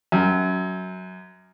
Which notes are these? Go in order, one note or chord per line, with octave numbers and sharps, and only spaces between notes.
F#2